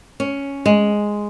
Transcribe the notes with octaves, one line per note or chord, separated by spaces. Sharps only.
C#4
G#3